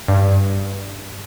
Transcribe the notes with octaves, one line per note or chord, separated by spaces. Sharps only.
G2